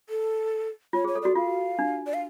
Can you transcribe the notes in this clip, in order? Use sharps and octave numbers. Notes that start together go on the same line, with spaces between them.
A4
F4 C#5
G#4 C#5
A4
F#4 D5
F4 F5
D4
D5
F5